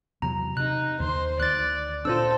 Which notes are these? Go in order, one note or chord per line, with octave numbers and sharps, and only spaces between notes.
E2 C3 F#3 A#5
C3 D#4 F#6
D#2 D3 D#3 C5 C6
D2 D#3 D5 F#6 A6
A#2 C#4 D4 F4 A4 C5 E6